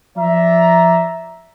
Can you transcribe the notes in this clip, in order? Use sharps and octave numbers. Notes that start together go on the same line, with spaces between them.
F3 D5 E5 A#5